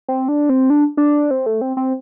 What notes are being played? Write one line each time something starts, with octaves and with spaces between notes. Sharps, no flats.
C4
D4
C4
D4
D4
C4
A3
C4
C4